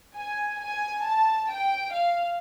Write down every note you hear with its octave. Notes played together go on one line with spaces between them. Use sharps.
G#5
G#5
A5
G5
F5